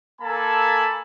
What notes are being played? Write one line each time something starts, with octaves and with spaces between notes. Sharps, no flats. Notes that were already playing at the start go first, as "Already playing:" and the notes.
A#3 A4 G#5 A5 B5